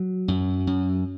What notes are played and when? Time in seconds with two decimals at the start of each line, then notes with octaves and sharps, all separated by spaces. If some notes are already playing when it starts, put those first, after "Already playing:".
Already playing: F#3
0.28 F#2
0.67 F#2